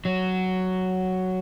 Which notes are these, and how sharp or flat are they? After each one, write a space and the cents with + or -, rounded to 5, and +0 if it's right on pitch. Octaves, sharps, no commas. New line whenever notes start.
F#3 +5